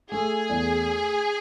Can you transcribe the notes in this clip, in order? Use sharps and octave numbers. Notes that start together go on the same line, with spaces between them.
A3 G#4
E2